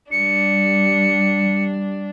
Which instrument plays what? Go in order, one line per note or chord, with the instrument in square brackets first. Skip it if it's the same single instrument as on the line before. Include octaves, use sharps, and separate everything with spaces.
[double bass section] G3 [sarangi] D4 [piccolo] C#7